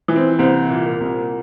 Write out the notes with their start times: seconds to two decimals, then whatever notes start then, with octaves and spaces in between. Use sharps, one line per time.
0.08 E3
0.16 C4
0.39 C2 C4
0.70 A#2
0.85 A#3
1.01 C2